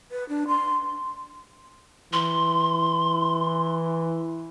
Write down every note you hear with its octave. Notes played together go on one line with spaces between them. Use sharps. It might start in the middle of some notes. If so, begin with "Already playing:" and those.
B4
D4
C6
E3 C6